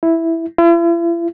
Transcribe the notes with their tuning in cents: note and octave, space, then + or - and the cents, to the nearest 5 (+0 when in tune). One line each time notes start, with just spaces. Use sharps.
E4 +0
E4 +45